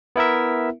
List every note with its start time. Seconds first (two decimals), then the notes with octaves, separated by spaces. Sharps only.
0.16 B3 E4 A#4 E5